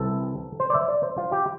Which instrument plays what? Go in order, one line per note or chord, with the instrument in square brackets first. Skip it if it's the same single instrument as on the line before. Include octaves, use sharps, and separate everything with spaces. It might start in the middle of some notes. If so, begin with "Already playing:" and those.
Already playing: [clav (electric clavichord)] C2 C3 E3 A4
C5
D5
E5
D5
C5
F4
G4